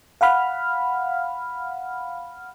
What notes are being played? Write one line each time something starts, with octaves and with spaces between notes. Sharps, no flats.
F5 F#5 B5 F6